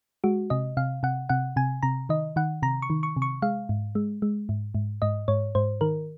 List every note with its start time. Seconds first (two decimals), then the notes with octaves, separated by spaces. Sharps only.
0.24 G#3 F#4
0.50 C3 D#5
0.77 C3 F5
1.03 C3 F#5
1.29 C3 F#5
1.56 C3 G#5
1.83 C3 A#5
2.09 D#3 D#5
2.36 D#3 F#5
2.62 C3 A#5
2.82 C#6
2.90 D#3
3.03 C#6
3.16 C3
3.22 C#6
3.42 G#3 F5
3.69 G#2
3.95 G#3
4.22 G#3
4.49 G#2
4.75 G#2
5.02 G#2 D#5
5.28 G#2 C#5
5.55 G#2 C5
5.81 D#3 A#4